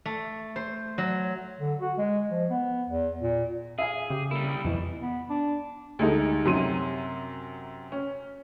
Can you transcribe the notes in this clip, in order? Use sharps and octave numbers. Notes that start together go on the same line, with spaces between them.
A3
C5
F#3
D3
F#4
G#3
F3
B3
E2
A#2
G#4 E5 F5 G#5
C#3 G4
G3 A#3 E4
F2 B2 E3 E4
B3
D4
D2 G3 G#3 D#4 A4 D#5
F#2 C3 F#3 C6 D#7
C#4